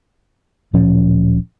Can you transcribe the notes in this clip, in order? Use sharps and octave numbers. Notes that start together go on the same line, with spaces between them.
D1 A#2 F3 C#4